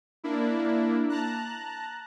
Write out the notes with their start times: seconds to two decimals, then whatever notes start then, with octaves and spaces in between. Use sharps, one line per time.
0.24 A#3 D4 E4
1.10 A5 A#5 F#6